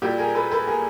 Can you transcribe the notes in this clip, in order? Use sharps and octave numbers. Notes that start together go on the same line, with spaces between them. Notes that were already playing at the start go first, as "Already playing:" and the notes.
A#2 G3 G4 A4
G#4 A#4
A4 B4
A4 B4
G#4 A#4